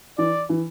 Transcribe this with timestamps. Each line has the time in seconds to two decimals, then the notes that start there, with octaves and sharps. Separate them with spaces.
0.18 E3 D5
0.49 E3